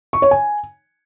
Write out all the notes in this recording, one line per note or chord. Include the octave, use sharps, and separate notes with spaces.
C#6
C#5
G#5